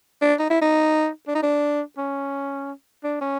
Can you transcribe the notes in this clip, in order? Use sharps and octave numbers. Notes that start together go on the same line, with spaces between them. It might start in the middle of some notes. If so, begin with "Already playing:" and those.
D4
D#4
E4
D#4
D4
D#4
D4
C#4
D4
C#4